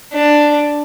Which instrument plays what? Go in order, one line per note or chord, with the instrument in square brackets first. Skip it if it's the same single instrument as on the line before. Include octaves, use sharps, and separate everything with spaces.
[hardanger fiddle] D4